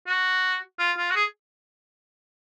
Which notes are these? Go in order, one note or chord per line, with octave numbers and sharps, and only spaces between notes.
F#4
F4
F4
F#4
G#4